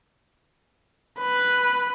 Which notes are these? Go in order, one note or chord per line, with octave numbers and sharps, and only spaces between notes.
B4